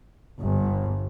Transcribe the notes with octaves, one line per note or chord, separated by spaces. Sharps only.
G1